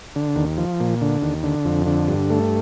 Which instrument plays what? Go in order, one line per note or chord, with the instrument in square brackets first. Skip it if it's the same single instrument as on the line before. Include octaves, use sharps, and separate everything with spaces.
[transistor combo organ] D3
D#2
F3
A#2
D3
D#2
D3
F2
D3
G2
A3